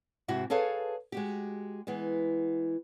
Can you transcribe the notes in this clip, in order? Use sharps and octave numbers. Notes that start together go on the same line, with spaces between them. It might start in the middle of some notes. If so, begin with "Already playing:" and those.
G#2 C3 E4 F#4
G#4 A4 B4 C#5 F5 A5
G#3 F#4 G4
E3 G#3 B3